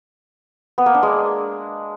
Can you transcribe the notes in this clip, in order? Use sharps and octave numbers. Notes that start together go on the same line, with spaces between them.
B3
A#3
D4
G#3